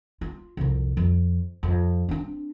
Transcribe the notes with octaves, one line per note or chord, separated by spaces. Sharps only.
F4
C2 F2
F2
F2
C4 D4